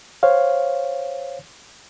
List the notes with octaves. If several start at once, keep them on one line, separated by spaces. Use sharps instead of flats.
C5 C#5 F5